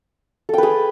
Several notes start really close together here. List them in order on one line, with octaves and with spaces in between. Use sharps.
A4 G5 B4 G#4